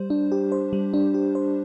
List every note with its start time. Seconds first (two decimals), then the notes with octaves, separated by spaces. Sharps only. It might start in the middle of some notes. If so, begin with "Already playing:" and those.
Already playing: G3 C5
0.10 D4
0.32 G4
0.52 C5
0.73 G3
0.94 D4
1.14 G4
1.35 C5